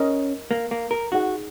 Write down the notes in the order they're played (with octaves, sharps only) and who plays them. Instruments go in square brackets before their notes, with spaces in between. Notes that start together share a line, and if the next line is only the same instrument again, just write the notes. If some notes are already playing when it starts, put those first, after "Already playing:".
Already playing: [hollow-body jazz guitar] C#4 [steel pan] A#4 D#5
[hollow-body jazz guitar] A#3
A#3
A#4
[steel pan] D#4 G#4 F#5 [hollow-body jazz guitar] F#4